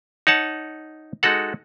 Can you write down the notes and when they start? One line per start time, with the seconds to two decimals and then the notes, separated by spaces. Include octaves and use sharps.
0.27 D#4 C#5 F#5 A5
1.23 G#3 D#4 F#4 A4 F#5